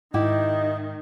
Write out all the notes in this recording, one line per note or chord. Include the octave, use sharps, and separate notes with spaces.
G#2 D#3 E4 G4 D#5